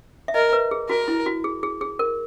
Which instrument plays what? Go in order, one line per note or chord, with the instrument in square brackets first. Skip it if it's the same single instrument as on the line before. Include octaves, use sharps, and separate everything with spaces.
[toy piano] E5
[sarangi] A#4 [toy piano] D#5
[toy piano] B4
G#4
[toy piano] F#4 [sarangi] A#4
[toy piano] E4
F#4
G#4
G#4
G#4
A#4